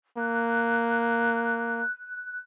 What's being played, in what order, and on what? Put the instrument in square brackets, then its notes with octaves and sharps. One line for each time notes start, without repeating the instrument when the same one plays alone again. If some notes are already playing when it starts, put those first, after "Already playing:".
[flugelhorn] A#3 [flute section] F#6